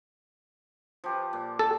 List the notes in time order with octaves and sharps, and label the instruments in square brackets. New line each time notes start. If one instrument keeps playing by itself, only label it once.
[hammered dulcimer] F3 G4 B4
A#2
[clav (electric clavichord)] A4